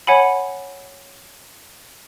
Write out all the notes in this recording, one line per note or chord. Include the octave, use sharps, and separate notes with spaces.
C#5 F#5 G#5 B5